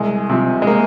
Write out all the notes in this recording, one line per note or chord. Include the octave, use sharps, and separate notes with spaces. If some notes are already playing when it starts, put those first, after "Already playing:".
Already playing: C2 G#3
C3 F3
G#3
A#3